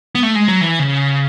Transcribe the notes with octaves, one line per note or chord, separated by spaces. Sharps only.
B3
A3
G#3
F#3
E3
C#3